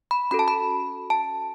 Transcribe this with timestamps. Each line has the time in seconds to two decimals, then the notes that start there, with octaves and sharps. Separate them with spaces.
0.11 B5
0.31 C#4 F#4 A4 B5
0.39 A5
0.48 B5
1.10 A5